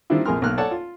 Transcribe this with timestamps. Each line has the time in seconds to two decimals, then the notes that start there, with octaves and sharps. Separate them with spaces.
0.10 D#3 G3 C4 D4 E4 F4
0.26 A#1 F2 G#4 A#4 C6 F6
0.42 B1 A#3 F6 F#6
0.58 A4 C#5 D5 F#5 A5
0.71 F4